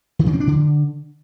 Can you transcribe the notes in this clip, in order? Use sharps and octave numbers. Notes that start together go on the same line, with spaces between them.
D#3
C#3
C4
D4
D3